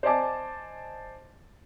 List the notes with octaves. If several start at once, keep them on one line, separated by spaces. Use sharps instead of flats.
C5 D5 D#5 G#5 A5 D6